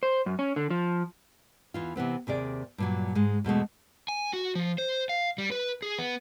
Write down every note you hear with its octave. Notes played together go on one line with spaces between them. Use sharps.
C5
F#2
C#4
D3
F3
E2 E3 F4
C3 E3 B3 C4
D#2 C3 G#4 D5
G2 A#2 F#3
G#2 G#3
E2 B2 G#3 A3
G#5
F#4
F3
C5
F5
G3
B4
G#4
B3